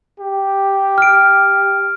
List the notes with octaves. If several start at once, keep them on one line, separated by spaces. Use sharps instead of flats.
G4
F6 D7